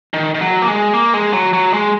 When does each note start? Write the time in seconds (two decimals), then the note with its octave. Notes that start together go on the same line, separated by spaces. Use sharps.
0.14 D#3
0.34 D#3
0.41 F#3
0.62 A#3
0.67 G#3
0.94 A#3
1.14 G#3
1.33 F#3
1.53 F#3
1.74 G#3